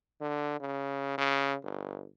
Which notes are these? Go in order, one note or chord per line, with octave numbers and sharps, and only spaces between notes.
D3
C#3
C#3
G1